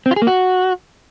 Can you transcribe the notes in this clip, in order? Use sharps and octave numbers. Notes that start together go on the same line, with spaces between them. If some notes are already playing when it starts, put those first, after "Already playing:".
C4
F4
G#4
A#3
F#4